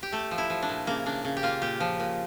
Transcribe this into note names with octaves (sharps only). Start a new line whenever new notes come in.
G4
A3 A4
F3
E4
F3
D4
A#2
C#3 A#3
C#3 D4
C#3
G4
A#3 F4
A#2 G4
F3
A#2